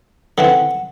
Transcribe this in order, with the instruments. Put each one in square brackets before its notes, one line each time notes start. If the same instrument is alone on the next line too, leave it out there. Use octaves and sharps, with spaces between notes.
[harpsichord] D3 E3 C4 [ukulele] F#5